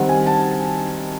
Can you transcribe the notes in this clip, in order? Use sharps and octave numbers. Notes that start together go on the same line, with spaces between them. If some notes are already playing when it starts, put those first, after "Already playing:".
Already playing: D#3 G3 C4 F#5
G#5
A5